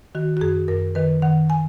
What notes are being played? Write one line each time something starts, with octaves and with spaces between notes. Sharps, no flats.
D#3 F#4
F#4
F#2 G#4
F#2 A#4
D#3 B4
D#3 F#5
G#5